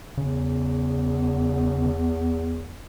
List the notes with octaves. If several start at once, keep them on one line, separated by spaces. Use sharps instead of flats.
E2 C#3